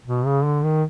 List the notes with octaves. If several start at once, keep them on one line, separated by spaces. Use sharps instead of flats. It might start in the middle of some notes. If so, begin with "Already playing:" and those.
B2
C#3
D3
D#3